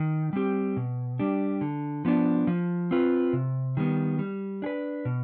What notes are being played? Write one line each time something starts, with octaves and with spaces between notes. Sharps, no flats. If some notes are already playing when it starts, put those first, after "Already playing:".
Already playing: D#3
G3 C4 G4
B2
G3 D4 G4
D3
F3 B3 D4
F3
C4 F4 B4
C3
D#3 G3 B3
G3
D4 G#4 B4
B2